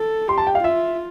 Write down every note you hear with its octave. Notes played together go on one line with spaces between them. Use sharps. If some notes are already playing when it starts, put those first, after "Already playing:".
Already playing: A4
G4 C6
A5
G5
F5
F4 E5